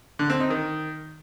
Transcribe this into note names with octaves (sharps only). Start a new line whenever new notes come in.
D3
C4
D#4
D#3